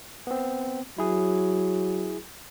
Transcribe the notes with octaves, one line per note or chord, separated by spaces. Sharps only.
B3 C4
F#3 E4 G#4